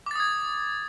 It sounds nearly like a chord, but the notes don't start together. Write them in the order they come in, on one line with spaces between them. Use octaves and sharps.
D6 A6 D#6 G#6